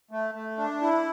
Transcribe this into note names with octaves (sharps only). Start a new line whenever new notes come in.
A3
A3
D4
E4